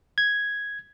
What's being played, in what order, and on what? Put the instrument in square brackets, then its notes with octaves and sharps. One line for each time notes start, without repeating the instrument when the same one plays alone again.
[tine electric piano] G#6